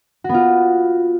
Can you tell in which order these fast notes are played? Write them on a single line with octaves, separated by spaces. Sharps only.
F#4 B3 F4